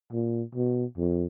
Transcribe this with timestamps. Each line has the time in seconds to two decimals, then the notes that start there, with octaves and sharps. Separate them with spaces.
0.13 A#2
0.55 B2
0.98 F2